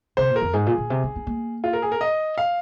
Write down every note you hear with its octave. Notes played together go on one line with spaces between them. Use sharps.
C3 C5
A#2
A#4
F2
G#2 G#4
A#2
A#2
C3
D#4
D#4
A#3
F4
A#4
G#4
A#4
D#5
F5